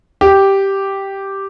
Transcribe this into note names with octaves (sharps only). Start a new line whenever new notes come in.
G4